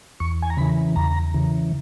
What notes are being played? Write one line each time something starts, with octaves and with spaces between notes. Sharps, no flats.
E2 C#6
G#5
A#5
C#3 E3 B5
E2 A#5
C#3 E3